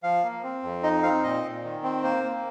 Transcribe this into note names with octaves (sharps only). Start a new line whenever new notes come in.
F3 F5
A#3
C4
F2
D#4 D#5
C4 F5
A#2 D#5
A#2
D#3
C4
A#3 C5
A#3